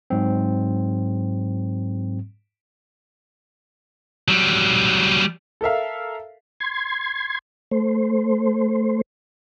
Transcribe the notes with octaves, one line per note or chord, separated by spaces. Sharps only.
G#2 F#3 C4
F#3 G3
A4 A#4 E5 F5
C6 G#6
A3 C5